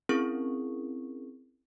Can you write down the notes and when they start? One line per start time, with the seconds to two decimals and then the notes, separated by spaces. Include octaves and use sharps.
0.09 C4 C#4 E4 G#4 A#4 C#6